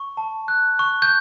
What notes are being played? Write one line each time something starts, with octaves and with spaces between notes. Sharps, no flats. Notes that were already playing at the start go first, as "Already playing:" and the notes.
Already playing: C#6
A5
F#6
C#6
G6